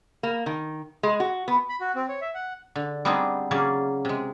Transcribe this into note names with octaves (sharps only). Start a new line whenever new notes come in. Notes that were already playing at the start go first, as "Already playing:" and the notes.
A#3
D#3
G#3
F#4
B3
B5
F#4
C4
C#5
E5
F#5
D3
G3 B3 C4 D4 D#4 G#4
C#3 F#3 A#3 G#4 D5
C3 G#3